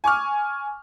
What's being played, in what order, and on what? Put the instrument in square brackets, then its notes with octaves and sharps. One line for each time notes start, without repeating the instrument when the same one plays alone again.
[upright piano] G#5 C#6 D6 F6